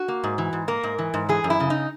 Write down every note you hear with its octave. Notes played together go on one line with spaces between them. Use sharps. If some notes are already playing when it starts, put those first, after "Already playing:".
Already playing: F#4
A#3
G#2
E3
G#2
A#3 A#4
G#2
E3
G#2
E3 G#4
F#2
E4
C#3
D#4